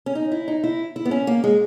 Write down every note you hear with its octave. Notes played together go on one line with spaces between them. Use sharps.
C#4
D#4
E4
D#4
E4
E4
B3
C#4
A#3
G#3